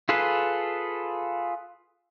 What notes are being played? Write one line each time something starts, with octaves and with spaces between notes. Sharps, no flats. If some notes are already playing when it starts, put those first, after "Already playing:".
F4 G#4 A4 B4